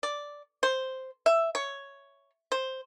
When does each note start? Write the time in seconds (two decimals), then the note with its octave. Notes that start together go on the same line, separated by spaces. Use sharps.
0.03 D5
0.63 C5
1.26 E5
1.55 C#5
2.52 C5